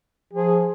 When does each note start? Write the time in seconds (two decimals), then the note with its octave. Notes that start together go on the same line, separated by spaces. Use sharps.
0.33 F3 G#4